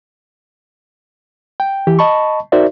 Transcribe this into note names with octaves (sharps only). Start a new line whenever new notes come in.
G5
E3 G4
D#5 A5 B5 C#6
D#4 F#4 A#4 C5 D5 E5